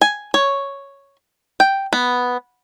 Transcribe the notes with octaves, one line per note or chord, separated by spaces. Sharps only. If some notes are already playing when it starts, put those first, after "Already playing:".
G#5
C#5
G5
B3